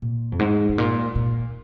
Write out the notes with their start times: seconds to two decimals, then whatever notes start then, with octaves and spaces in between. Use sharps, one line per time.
0.02 A#2
0.32 F2
0.39 G#2
0.69 G#2
0.78 A#2
1.15 A#2